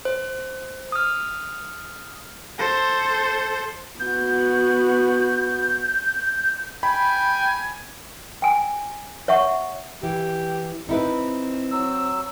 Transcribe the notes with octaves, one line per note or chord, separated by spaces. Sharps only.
C5
D#6 F6
A4 C5
B3 F#4 G6
G5 G#5 B5
G5 G#5
C#5 E5 F#5 C#6
E3 G4
C4 D#4 E4 B4
F#3 E6